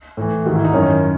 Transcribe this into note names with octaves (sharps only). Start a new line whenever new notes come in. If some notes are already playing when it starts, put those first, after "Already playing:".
A2 E3
G#2 D#3 F#4
E4
D#4
F#2 D#3 C#4